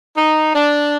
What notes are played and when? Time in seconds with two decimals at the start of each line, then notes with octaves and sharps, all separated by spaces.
0.14 D#4
0.54 D4